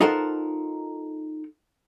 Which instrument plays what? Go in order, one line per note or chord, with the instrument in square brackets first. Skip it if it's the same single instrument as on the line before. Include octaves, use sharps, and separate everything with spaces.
[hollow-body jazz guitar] D#4 F4 A4 A#4 C5 F#5